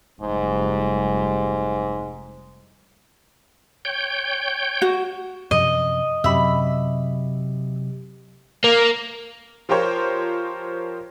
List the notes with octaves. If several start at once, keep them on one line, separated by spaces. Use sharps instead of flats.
F1 G#2 G3
C#5 G5 G6
F#4
F#2 C3 F3 D#5
F#2 C3 F#3 G4 E5 B5
A#3
F3 F4 G4 A#4 C5 C#5